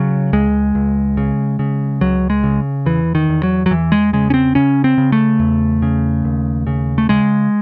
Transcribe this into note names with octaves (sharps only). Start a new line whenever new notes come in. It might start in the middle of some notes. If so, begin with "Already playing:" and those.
Already playing: C#3 F#3
C#2 G#3
C#2
C#3
C#3
C#2 F#3
G#3
C#3
E2 E3
D#3
E2
F#3
F#3
E2 E3
G#3
C#3 G#3
C#4
C4
C#3 C#4
C4
C#3
A3
E2
C#3
D#2
C#3
A3
C#3 G#3